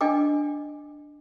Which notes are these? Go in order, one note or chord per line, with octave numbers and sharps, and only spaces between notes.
D4 D#5 G5 G#5 D6